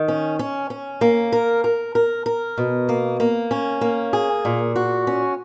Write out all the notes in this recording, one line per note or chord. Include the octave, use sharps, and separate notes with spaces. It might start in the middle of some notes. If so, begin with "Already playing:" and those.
Already playing: D#3
C#4
C#4
C#4
A#3
A#4
A#4
A#4
A#4
B2
A#3
A#3
C#4
A#3
G#4
A#2
F#4
C#4